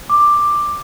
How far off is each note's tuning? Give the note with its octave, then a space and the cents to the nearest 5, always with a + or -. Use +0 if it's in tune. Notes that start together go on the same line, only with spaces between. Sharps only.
D6 +10